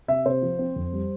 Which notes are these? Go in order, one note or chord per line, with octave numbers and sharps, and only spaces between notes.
C3 E5
C3 C5
F3
C4
F2
G3